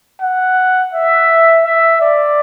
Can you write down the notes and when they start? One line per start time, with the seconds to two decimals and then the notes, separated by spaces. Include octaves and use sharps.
0.21 F#5
0.93 E5
1.65 E5
2.01 D5